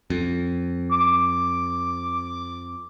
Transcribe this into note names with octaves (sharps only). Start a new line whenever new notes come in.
F2
D6